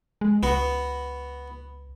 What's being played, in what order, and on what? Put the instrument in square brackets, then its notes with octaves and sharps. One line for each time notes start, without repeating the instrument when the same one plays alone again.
[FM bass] G#3
[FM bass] C#2 [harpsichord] B3 F#4